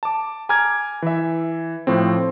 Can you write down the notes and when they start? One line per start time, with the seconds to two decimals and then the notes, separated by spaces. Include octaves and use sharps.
0.03 A5 D6
0.49 G#5 A#5 D6 F6 G#6
1.02 E3 E5
1.87 A2 F3 C4